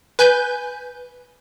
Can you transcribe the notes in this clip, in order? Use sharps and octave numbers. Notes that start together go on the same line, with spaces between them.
B4 G#5 G6